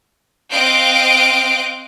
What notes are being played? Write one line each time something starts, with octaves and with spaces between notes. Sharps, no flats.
C4 D#5 F5 F#6 G6 D7